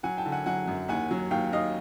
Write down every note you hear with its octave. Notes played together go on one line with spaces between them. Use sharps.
F#3 F#5 G#5
G5 A5
D3
F#5 G#5
F#3 F#5 G#5
F#2
D#2 F#5 G#5
F#3
D#2 F5 G5
D#2 D#5 F5